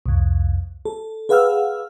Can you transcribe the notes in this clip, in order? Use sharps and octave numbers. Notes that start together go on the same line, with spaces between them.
C2 F2
A4
G#4 B4 F5 F#5 E6 F6